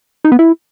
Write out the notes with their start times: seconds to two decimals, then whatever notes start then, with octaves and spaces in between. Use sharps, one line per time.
0.24 D#4
0.32 B3
0.39 E4